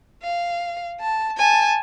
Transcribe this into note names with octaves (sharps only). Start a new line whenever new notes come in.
F5
A5
G#5 A5